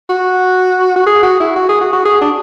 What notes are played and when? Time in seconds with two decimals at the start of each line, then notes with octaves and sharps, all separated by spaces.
0.09 F#4
0.96 F#4
1.06 G#4
1.23 F#4
1.40 E4
1.56 F#4
1.69 G#4
1.81 F#4
1.93 F#4
2.05 G#4
2.21 D4